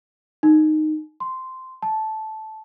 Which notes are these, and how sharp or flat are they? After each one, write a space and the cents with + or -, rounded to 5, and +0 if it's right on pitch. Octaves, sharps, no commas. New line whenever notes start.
D#4 -10
C6 -10
A5 -10